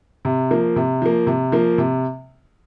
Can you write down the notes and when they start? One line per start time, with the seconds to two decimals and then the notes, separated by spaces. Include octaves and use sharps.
0.25 C3
0.51 F3 A#3
0.76 C3
1.02 F3 A#3
1.27 C3
1.52 F3 A#3
1.78 C3